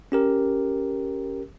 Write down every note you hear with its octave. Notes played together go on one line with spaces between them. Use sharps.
C#4 G4 A#4